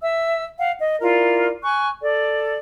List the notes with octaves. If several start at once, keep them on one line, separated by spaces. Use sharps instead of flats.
E5 E6
F5 F#5
D#5
E4 F4 A#4 D5
G#5 C#6 F#6
A4 D5